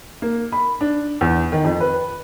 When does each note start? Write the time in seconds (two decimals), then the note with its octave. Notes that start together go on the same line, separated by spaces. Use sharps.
0.22 A#3
0.52 B5
0.81 D4
1.21 E2
1.52 D#3
1.64 F2
1.80 B4